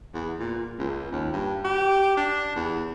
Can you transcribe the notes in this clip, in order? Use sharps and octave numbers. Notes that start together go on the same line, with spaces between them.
E2
A#2
C#2
D#2
G2
G4
D4
E2